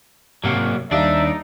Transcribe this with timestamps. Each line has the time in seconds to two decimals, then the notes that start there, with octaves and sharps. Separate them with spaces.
0.44 G#2 C3 F#3 A#3 F#4 G4
0.91 D#2 G3 D4 D#4 D5 E5 F5